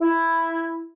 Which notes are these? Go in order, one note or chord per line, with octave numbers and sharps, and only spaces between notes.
E4